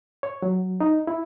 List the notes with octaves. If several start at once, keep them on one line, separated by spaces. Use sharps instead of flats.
C#5
F#3
D#4
E4